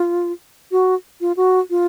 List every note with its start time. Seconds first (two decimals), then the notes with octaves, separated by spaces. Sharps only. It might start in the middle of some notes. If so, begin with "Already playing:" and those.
Already playing: F4
0.72 F#4
1.21 F4
1.37 F#4
1.70 F4